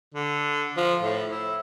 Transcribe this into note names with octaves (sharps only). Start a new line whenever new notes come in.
D3
F3
A2
E4